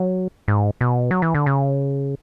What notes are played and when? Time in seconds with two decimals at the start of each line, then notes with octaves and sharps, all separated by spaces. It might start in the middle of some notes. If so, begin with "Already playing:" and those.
Already playing: F#3
0.48 G#2
0.81 B2
1.11 F#3
1.22 E3
1.35 D3
1.46 C#3